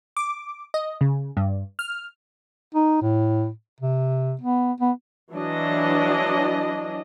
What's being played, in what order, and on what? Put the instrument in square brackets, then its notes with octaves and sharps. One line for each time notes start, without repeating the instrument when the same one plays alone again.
[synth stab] D6
D#5
C#3
G2
F6
[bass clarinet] D#4
A2
C3
B3
B3
[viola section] E3 F#3 D4 D#5